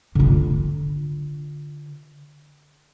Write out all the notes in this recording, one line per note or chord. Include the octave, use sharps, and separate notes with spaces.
D3 F4